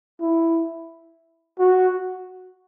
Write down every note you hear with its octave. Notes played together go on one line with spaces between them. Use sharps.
E4
F#4